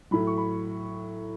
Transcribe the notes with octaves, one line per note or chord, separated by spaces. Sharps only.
A2 F#3 B5
C#6
B5